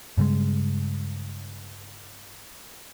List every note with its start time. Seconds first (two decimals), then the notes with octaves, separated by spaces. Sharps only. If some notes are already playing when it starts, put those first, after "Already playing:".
0.17 G2 C#3 G3 G#3